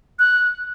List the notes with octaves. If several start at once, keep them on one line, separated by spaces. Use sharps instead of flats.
F#6